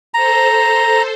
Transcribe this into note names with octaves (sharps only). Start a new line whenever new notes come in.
A4 C5 A#5